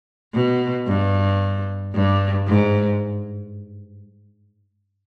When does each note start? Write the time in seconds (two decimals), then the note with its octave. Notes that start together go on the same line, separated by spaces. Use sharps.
0.35 B2
0.88 G2
1.94 G2
2.48 G#2